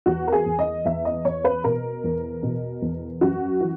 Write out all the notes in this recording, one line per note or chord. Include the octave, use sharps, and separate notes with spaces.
E2 F#4
A#4
G#4
E2
D#5
E2 E5
D#5
E2 C#5
B4
B2 A#4
E2
B2
E2
F#2 F#4
E3